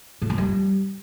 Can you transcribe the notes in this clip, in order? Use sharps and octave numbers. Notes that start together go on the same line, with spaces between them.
A2
F#2
G3